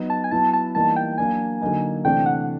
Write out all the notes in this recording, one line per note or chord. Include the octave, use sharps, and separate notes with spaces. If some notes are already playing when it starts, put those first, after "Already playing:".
Already playing: F#3 B3 D#4
A5
G#5
F#3 B3 E4 A5
A5
E3 G3 A#3 D#4 A5
G5
F#3 A#3 D4 G#5
D3 F#3 A#3 D#4
C3 E3 A3 D4 G5
F#5